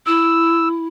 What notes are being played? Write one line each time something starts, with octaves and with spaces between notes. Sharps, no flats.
E4 E6